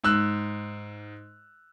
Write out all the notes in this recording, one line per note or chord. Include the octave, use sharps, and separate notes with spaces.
G#2 E6 F#6